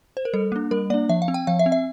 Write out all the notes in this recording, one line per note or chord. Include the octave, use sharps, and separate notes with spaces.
C5
A#4
G3 A4
A#3 D4
G3 A#4
A#3 D4 D5
F3 E5
F5
C4
G5
F3 F5
E5
C4
E5